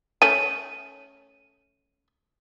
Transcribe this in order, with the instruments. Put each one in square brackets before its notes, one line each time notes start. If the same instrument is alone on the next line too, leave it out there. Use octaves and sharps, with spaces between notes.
[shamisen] A3 C#4 [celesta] D#7